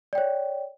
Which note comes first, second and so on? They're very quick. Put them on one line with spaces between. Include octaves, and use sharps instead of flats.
D5 G5 C#5